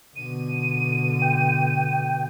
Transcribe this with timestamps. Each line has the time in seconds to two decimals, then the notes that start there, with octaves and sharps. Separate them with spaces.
0.16 B2 D3 D#7
1.22 G5